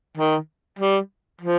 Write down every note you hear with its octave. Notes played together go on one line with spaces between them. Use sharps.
D#3
G3
F3